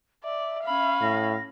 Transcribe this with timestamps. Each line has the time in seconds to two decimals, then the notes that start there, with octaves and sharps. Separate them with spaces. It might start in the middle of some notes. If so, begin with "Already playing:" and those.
0.24 D5 E5
0.64 C#4 F5 B5
1.01 A2 A#6